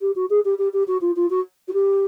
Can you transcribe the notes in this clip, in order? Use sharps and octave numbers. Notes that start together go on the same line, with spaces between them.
G4
F#4
G#4
G4
G4
G4
F#4
F4
F4
F#4
F#4
G4